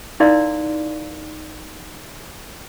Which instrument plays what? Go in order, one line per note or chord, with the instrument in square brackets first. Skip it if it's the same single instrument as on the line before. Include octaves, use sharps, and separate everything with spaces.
[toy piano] D#4 E4 A#4 D5 F5 C6